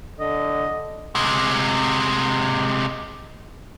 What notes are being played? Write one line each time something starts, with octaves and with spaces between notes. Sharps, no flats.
D3 D#5
C3 G#3